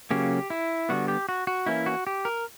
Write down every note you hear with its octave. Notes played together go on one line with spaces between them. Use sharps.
C#3 F#3 A#3 C#4 G4
E4
D3 G3 B3 F#4
G4
F#4
F#4
E3 A#3 C#4 E4
F#4
G4
A#4